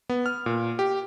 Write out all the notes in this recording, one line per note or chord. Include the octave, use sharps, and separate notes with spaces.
B3
F6
A#2
G4